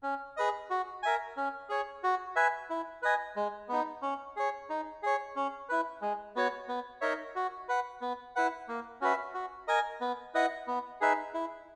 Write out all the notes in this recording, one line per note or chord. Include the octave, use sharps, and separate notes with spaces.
C#4
G#4 B4 D#5
F#4
A#4 E5 G#5
C#4
G#4 C#5
F#4
B4 E5 G#5
E4
B4 D#5 G#5
G#3
B3 D#4
C#4
G#4 C#5
D#4
G#4 C#5
C#4
E4 B4
G#3
B3 F#4 C#5
B3
D#4 A#4 C#5 E5
F#4
B4 F#5
B3
E4 B4 F#5
A#3
C#4 F#4 B4 E5
F#4
A#4 D#5 G#5
B3
E4 B4 D#5 F#5
B3
D#4 G#4 B4 E5
E4